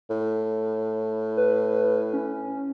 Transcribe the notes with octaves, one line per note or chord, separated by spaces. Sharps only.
A2
B4
C#4